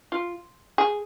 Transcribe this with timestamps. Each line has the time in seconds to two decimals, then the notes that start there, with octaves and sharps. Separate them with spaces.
0.12 F4
0.78 G#4